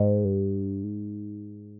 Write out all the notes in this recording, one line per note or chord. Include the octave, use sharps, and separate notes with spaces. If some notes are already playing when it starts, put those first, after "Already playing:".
Already playing: G#2
G2
G#2